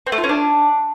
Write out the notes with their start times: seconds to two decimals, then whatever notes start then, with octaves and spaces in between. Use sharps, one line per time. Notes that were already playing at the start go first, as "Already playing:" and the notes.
0.07 C4
0.12 A3
0.18 F4
0.24 C#4
0.29 D4